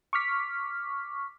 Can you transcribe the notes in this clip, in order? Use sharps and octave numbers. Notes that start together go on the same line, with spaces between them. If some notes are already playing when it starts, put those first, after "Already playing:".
C#6 D6 F6 B6